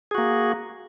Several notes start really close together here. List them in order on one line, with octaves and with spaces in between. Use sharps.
G#4 F#4 A#3